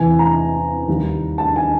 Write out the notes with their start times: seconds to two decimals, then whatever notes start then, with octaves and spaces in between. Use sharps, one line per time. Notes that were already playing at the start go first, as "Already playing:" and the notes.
Already playing: E2 C3 E3 G#5
0.19 A#5
0.87 D#2 D#3 G3
1.38 A5
1.56 G#5